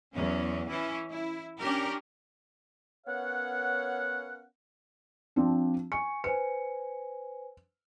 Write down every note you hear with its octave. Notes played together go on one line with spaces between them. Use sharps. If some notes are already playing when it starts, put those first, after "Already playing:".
E2 F#3 C#4
E3 C#4 E4
E4
C#4 D4 G4 A#4
B3 C#4 A#4 C#5 F5 F#5
F3 C4 D4
G#5 C#6 C#7
B4 C5 G#5 C#7